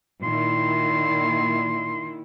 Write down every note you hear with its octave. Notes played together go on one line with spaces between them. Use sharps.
A#2 D#3 E4 C6